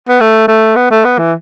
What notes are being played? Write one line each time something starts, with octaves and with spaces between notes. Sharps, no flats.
B3
A3
A3
B3
A3
B3
E3